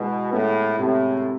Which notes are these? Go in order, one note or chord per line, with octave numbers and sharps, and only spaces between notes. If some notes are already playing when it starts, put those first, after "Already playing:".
Already playing: B2 G#3 E4
A2 B3
A2 C3